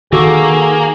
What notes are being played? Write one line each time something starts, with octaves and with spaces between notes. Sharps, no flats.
D#3 A#3 F#4 G#4 A4 D6